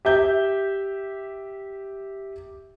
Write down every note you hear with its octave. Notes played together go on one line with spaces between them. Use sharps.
G4 E5 G6